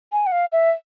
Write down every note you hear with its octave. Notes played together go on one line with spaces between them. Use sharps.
G#5
F#5
F5
E5